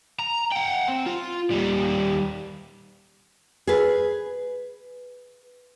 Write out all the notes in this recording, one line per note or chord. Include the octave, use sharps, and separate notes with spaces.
A#5
F#5 G5
C4
F4
D#2 G3
G#4 B4